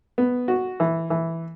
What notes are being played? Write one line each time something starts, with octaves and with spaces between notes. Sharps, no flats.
B3
F#4
E3
E3